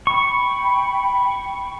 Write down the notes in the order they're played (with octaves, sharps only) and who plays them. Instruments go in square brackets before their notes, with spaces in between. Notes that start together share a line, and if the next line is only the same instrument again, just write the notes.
[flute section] G5 B5 [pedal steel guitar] C#6